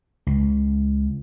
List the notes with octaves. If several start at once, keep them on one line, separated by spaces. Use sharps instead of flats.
C#2